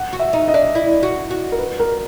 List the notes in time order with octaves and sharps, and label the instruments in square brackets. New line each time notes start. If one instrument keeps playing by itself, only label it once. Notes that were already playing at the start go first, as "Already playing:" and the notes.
Already playing: [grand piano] F#5
[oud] F#4
[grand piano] E5
[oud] D#4
[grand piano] D#5
[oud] D4
[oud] E4 [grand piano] D5
[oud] F#4
F#4
[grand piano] A#4
B4
A#4